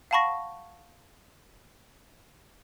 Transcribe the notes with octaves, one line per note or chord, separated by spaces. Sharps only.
F5 F#5 A5 B5 C#6 A#6